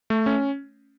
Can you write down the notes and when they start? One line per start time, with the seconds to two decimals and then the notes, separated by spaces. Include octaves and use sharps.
0.10 A3
0.26 C#4